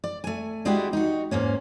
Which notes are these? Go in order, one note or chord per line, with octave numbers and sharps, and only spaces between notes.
D5
A3 G#5
G3 G#3 D4 E4 F#4 G4
D#4 F#4
E2 G#2 A#3 C#4